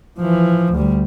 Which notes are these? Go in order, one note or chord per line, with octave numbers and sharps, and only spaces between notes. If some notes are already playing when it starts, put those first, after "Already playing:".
E3 F3
D2 G3